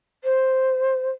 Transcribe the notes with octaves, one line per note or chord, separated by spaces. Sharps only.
C5